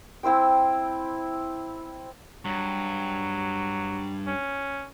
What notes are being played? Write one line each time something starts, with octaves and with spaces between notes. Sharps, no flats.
C4 E4 C5 G5
G2 F#3
C#4